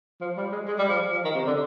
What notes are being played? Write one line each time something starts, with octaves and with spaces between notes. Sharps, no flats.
F3
G3
G#3
G#3
G3
F3
F3
D#3
C3
D3